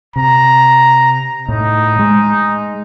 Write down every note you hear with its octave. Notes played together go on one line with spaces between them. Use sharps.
C3 A#5
A2 D#4
G#3